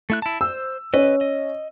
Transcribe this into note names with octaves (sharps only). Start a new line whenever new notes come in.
A3 E4 F#6
E4 A5
C5 E6
C#4 B4 D#5
D#5